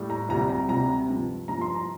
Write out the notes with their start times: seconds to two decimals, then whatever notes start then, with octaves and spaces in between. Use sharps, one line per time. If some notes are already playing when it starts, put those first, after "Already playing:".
Already playing: A2 G3
0.10 A#5
0.29 D2 C3 G3 A#5
0.49 A#5
0.69 D2 C3 G3 A#5
1.09 G2 F3
1.48 G2 F3 A#5
1.61 C6
1.75 A#5